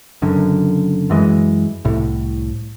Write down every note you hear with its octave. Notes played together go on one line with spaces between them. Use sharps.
F#1 F#2 D3
F#2 E3 G#3
C2 A2